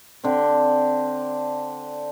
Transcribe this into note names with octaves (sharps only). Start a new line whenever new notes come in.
D3 C4